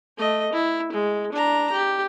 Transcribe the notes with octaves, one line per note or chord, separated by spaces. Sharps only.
A3 D#5
E4
G#3
D4 A#5
G4